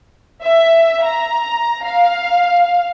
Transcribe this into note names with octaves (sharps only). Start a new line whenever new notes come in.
E5
A#5
F5